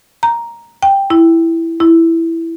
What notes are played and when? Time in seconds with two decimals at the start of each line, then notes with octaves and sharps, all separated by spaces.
0.23 A#5
0.83 G5
1.10 E4
1.80 E4